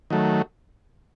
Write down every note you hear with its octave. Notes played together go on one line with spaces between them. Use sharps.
D#3 F#3 A3